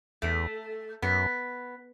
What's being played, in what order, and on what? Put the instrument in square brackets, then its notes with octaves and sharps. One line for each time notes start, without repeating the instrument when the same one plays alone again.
[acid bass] E2 [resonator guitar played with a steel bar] A3
[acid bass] F#2 [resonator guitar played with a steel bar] B3